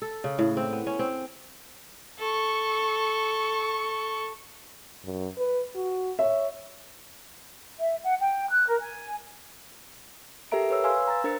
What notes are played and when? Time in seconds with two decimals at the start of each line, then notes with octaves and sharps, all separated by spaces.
0.02 A4
0.24 C#3
0.39 A2
0.57 C4
0.73 B3
0.87 C#4
0.99 C4
2.19 A4 C#6
5.04 F#2
5.37 B4
5.75 F#4
6.19 C#5 E5
7.80 E5
8.04 F#5
8.20 G5
8.51 F#6
8.68 A#4
8.81 G#5
10.52 G4 A4 A#4 E5 A#5 D7
10.70 B4 C#5 E6
10.84 B4 F5 G#5 C6 E6
11.08 A#5 A6
11.24 D4 A#4 C5 A6 C#7